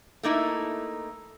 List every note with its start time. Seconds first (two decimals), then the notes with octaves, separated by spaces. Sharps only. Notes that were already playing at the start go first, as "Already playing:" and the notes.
0.23 A3 A#3 D#4 E4